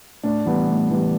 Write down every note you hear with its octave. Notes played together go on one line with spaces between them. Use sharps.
A2 D4
E3 G3 B3
A2
E3 G3